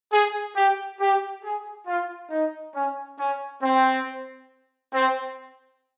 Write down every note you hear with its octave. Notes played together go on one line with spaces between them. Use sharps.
G#4
G4
G4
G#4
F4
D#4
C#4
C#4
C4
C4